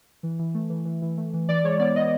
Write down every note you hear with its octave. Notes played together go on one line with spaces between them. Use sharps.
E3
E3
A3
E3
E3
E3
A3
E3
E3 D5
G#3 C#5
B3 D5
B3 D#5